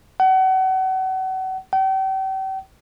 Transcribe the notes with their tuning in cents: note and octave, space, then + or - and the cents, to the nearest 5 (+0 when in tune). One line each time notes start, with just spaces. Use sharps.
F#5 +35
G5 -40